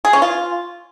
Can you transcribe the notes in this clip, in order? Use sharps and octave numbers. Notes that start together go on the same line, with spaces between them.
G#4
C#4
F4